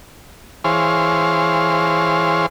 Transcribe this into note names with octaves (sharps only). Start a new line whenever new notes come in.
E3 G#4 C5 C#5 F5 C6